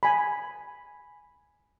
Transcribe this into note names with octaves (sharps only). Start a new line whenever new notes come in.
G#5 B5